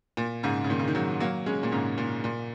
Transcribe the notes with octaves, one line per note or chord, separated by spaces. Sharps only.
A#2
G#2 C#3
C#3
A#2 D#3
C#3
D#3
C#3 F#3
F#3 A#3
G#3 C#4
A#2
G#2 C#3
A#2
A#2